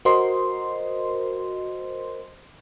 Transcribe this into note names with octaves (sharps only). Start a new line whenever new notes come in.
F#4 A#4 C5 D#5 C6